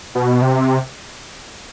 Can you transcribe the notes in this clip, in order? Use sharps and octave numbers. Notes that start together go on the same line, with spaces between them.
B2
C3